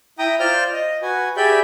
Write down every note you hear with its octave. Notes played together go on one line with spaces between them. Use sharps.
E4 G5 A#5 D#6
F4 C5 D5 F6 G6
D#5
F#4 B4 G#5
G4 G#4 D5 E5 B5 G6